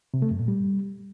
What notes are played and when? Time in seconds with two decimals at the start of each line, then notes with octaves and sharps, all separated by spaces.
0.14 C3
0.22 A3
0.31 F#2
0.39 A#2
0.48 G3